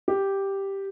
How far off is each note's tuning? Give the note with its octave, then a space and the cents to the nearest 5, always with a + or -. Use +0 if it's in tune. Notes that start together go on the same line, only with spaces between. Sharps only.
G4 +0